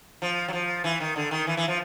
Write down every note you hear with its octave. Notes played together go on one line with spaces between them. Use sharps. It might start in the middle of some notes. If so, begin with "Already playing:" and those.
F3
F#3
F3
E3
D#3
D3
D#3
E3
E3
F3